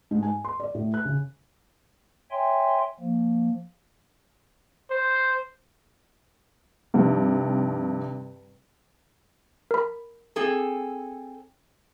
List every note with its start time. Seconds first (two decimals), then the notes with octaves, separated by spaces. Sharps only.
0.11 G#2
0.23 G#5
0.45 C6
0.60 D5
0.75 A2
0.94 F#6
1.05 C#3
2.31 C#5 E5 G5 G#5 C6
3.00 F3 A#3
4.91 C5
6.94 G2 C3 D#3 F3
9.71 A#4 B5
10.36 C4 G#4 A4